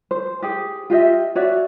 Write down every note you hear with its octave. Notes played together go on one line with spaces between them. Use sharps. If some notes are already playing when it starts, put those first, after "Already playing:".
C5
G4 G#4 G5
F4 G4 D#5 E5
F#4 C#5 D5 E5